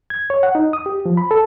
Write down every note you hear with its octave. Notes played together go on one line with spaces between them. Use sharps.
G#6
C#5
F#5
D#4
D#6
G4
F3
B5
A4